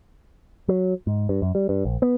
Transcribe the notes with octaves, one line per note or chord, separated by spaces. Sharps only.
F#3
G#2
G2
F#2
G3
G2
A#1
B3